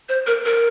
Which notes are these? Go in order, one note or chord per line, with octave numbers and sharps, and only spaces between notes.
C5
A#4
A#4